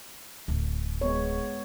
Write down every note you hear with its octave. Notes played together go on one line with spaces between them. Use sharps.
D1
G#3 B3 C#5